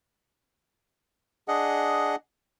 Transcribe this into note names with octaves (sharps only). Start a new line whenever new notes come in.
D4 G#4 D#5 F#5